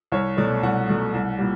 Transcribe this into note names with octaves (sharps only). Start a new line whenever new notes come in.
C2 C#5
B2 F#3 A3 D5
C2 F#5
B2 F#3 A3
C2
A#2 G3